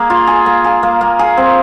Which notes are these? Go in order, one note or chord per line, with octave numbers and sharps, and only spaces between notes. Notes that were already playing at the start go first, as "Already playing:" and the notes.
Already playing: A#3 G#4
F4
G#4
A#3
G#4
A#3
A#3
G#4
C4